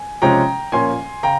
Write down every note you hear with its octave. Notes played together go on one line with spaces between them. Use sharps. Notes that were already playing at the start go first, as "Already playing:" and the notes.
Already playing: G#5
C3 F3 G#3 C#4 G5 A#5
A#2 F3 A#3 C#4 G#5 C6
C#3 G5 A#5